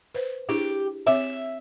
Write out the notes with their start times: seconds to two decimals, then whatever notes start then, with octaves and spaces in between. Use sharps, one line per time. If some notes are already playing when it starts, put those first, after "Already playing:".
0.15 B4 C5
0.49 D4 E4 G4 G#4
1.07 C4 C#5 E5 D6